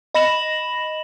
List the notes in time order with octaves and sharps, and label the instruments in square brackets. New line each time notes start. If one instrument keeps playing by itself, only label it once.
[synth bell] D#5 B5 A#6 E7 F#7